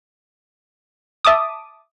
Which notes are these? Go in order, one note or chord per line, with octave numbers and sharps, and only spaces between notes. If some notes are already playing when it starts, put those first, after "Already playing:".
E5 A5 D6 D#6